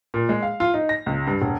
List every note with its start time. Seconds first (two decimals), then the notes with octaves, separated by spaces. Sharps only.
0.14 A#2
0.29 G#3
0.42 F5
0.60 F4
0.74 D#4
0.89 A#6
1.06 C#2
1.27 G2
1.42 E1